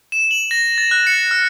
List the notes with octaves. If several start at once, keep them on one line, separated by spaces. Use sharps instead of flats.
E7
F#7
A#6
A6
F#6
C#7
F6